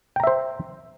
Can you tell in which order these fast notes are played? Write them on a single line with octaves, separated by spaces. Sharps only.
G5 A#5 E5 C5